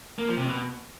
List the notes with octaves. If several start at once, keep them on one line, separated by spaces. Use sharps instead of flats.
A#3
F3
C3
B2